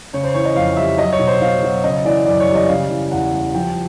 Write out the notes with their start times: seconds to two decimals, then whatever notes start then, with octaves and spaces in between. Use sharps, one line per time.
0.13 C#3 C#5
0.24 C5
0.34 E3 C#5
0.45 D#5
0.55 F2 F5
0.77 G3 E5
0.98 F#3 D#5
1.12 C#5
1.19 B2
1.27 C5
1.41 B2 F5
1.63 F#3
1.84 C#3 D#5
2.05 E3 D5
2.26 F#2 D5
2.40 C#5
2.48 G3
2.55 D#5
2.68 C#3 F5
2.90 E3
3.11 E2 F#5
3.33 G3
3.55 F3 G5